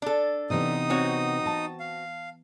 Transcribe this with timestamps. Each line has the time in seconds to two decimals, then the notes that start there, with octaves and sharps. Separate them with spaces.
0.02 D4 A4
0.50 C3 E3 B3 D#4 D#6
0.90 C4 F#4 C#5
1.46 A5
1.80 F5